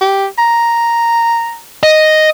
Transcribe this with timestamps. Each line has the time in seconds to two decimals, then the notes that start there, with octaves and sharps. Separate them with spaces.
0.01 G4
0.38 A#5
1.83 D#5